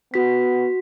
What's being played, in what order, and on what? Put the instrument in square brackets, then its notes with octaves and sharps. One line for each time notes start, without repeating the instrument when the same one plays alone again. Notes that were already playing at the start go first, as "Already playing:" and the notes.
[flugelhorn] B3 [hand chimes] F#4 B6